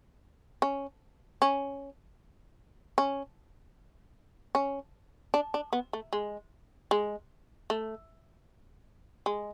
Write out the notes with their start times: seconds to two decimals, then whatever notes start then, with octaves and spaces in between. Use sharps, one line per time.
0.62 C#4
1.42 C#4
2.98 C#4
4.55 C#4
5.34 D4
5.54 D4
5.73 B3
5.93 A3
6.13 G#3
6.91 G#3
7.70 A3
9.26 G#3